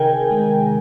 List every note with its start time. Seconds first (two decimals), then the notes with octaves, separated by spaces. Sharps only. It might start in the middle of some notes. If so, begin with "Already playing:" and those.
Already playing: C3 D#3 G#4 A#4 G5 G#5
0.31 G#3